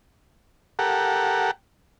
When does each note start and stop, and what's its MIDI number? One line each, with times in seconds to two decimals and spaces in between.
0.79 1.51 67
0.79 1.51 69
0.79 1.51 70
0.79 1.51 78